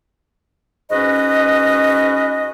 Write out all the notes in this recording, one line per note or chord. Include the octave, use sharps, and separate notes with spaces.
G#2 C#4 F#4 B4 D#5